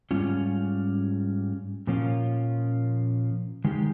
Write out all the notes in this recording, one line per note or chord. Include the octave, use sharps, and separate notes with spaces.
G#2 G3 C#4 F4
A#2 F3 A#3 C#4 F4
D#3 G#3 D#4 G4